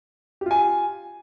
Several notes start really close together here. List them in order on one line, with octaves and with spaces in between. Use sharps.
G4 F4 G#5